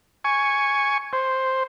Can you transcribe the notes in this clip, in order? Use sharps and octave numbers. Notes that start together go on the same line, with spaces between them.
G#5 C#6
C5